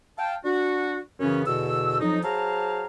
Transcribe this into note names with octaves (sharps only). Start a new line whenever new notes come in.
F5 G5 A5
D4 F#4
F#2 C#3 E3 B3 C#4
E2 B2 D3 E6
F2 F3 F#3 D#4
F#3 G#4 C5 F5 A5 A#5